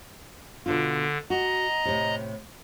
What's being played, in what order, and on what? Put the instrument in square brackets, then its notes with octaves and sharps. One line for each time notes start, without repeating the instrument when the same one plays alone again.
[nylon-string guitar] B2 D4 F4 [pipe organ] D3
[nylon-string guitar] F#4 [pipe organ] D#5 A#5
[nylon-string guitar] A2 C3